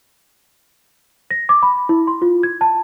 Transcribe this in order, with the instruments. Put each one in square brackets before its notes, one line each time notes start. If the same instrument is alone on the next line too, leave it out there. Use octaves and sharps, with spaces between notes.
[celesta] A#6
D6
B5
E4
C6
F4
G#6
A5